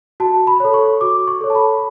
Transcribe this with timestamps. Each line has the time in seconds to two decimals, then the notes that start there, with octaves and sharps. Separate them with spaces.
0.20 F#4 A5
0.47 B5
0.60 A4 C#5
0.74 C#6
1.01 F#4 D6
1.28 C#6
1.41 A4 C#5
1.50 A5
1.55 B5